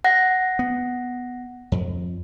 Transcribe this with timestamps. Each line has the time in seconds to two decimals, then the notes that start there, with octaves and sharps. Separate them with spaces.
0.04 F#5 A#6
0.59 B3
1.72 F2